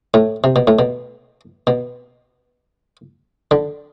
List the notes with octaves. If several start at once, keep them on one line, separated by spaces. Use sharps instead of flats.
A2
C3
B2
A2
B2
B2
D3